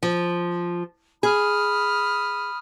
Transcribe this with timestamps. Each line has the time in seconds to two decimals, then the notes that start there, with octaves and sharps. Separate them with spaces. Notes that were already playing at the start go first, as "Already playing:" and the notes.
0.03 F3
1.23 G#4 B5 D#6 F6